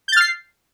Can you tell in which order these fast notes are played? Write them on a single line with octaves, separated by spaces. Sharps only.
G6 A6 F6 C7